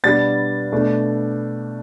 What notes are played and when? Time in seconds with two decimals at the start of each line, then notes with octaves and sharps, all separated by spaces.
0.04 B2 G3 B3 D4 A6
0.72 B2 A3 D4